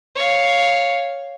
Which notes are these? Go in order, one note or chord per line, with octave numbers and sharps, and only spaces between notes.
C#5 F5